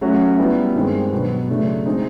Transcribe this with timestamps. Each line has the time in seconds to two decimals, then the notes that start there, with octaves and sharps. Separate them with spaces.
0.01 F#3 A3 C#4 F#4
0.38 G3 B3 E4
0.75 G2 D#3 G#3 C4
1.12 B2 F#3 B3
1.49 C#3 F#3 A3 D4
1.86 G#3 C4 D#4